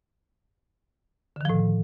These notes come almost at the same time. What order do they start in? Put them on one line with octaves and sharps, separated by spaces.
D3 D#3 F3 A2